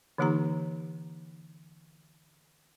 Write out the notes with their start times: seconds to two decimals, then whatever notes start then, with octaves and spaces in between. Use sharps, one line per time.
0.18 D3 E3 A#3 D#4 G4 A#5